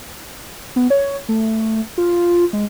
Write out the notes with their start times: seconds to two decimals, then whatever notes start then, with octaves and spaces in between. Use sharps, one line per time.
0.76 B3
0.90 C#5
1.29 A3
1.98 F4
2.53 G#3